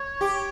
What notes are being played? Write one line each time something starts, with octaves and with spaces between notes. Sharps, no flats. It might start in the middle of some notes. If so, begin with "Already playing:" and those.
Already playing: C#5
G4